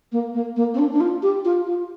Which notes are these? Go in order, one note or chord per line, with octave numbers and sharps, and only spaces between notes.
A#3
A#3
A#3
C4
D4
D4
F4
G4
F4
F4